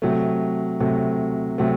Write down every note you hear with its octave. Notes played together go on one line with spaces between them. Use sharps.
C3 F#3 A3
C3 F#3 A3
C3 F#3 A3